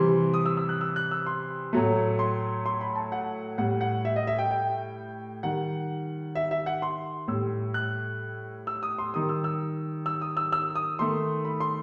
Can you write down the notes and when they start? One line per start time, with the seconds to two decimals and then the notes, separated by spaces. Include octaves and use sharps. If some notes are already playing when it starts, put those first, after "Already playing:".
Already playing: C3 E3 G3 C6
0.34 D#6
0.46 E6
0.57 E6
0.69 F#6
0.81 E6
0.96 F#6
1.11 E6
1.26 C6
1.73 A2 F#3 A3
2.19 C6
2.66 C6
2.81 B5
2.96 A5
3.12 F#5
3.58 A2 G3 F#5
3.81 F#5
4.05 E5
4.16 D#5
4.27 E5
4.38 G5
4.51 G5
5.43 D#3 G3 F#5
6.35 E5
6.51 E5
6.66 F#5
6.82 C6
7.28 A2 G3 E6
7.74 F#6
8.67 E6
8.83 D#6
8.98 C6
9.14 D#3 G3 D#6
9.29 E6
9.44 E6
10.06 E6
10.21 D#6
10.37 E6
10.52 E6
10.75 D#6
10.99 D#3 A3 C6
11.45 B5
11.60 C6